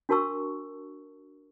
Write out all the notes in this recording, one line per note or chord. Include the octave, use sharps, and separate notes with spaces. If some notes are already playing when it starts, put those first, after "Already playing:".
D4 F#4 A#4 A5 C#6 E6